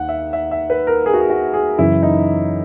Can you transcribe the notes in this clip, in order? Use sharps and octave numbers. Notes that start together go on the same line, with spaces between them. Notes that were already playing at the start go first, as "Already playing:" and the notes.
Already playing: D#2 F#5
E5
E5
E5
B4
A#4
G#4
F#4
G#4
F#4
G#4
F#2 C#3 E3 E4
D#4